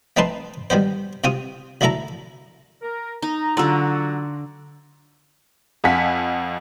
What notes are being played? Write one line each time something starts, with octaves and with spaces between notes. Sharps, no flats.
A3 C4 D#4 B4 A5 C6
D#3 G3 B3 C5
C3 C4 F4 D#6
B1 D3 A3 E4 A4 A#5
A#4
D#4 A#5
D3 F#3 F4 F#4 D5 A#5 E6
F2 F5 F#5 G#5 B6